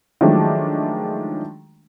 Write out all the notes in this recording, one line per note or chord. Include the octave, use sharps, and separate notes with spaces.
D#3 F3 F#3 G#3 A3 D4